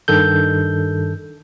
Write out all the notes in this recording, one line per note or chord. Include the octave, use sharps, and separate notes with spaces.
G2 D#3 A4 G6